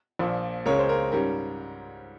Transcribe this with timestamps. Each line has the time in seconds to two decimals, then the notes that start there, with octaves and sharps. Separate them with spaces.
0.19 A#1 A#2 F3
0.66 C#2 C#3 G#3 C#4 A#4 C#5
0.79 C5
0.89 A#4
1.12 G#2 G3 C#4 A#4